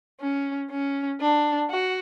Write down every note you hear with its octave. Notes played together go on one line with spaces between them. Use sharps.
C#4
C#4
D4
F#4